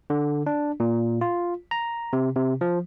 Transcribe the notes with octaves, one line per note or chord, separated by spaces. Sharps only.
D3
D4
A#2
F4
A#5
C3
C3
F3